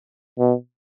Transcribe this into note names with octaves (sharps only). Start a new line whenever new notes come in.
B2